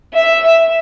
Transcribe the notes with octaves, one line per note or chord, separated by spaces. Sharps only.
E5